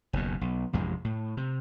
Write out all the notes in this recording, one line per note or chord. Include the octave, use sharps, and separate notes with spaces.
F#1 D#2 B2
B1
A1 F2 C3 G#3
A2
C3